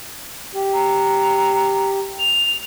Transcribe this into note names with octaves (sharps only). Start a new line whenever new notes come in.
G4
A#5
F7